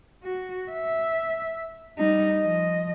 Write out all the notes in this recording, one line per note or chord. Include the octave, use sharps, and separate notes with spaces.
F#4
E5
G3 D#4
F3 D#5